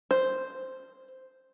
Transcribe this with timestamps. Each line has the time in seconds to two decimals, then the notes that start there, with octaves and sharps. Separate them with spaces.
0.11 C5